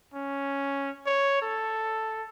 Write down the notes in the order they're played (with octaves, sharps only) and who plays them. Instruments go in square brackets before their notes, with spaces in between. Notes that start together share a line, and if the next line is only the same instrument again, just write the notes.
[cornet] C#4
C#5
A4